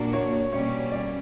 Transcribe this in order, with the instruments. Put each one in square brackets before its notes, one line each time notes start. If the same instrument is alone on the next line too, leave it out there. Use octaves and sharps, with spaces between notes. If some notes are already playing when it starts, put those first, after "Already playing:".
Already playing: [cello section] A#2 A#3 D4 F#4
[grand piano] C#5
C#5
[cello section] B2 G3 A#3 C#4 [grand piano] C#5
[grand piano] D5